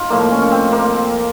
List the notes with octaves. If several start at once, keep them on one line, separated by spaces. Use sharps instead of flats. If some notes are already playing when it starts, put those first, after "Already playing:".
Already playing: D#4 F4
A2 F3 A#3
C#4
C#4
C4
A#3